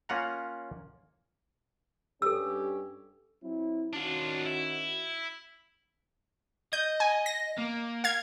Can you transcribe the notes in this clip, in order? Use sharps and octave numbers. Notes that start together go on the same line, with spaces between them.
A#3 C#4 F4 F#5 A#5
G2 C#4 G4 A4 E6
F#3 C4 E4
D#3 C#4 D4 F4 F#4
E4
D#5 G6
G#5
A#6
A#3
F5 G#6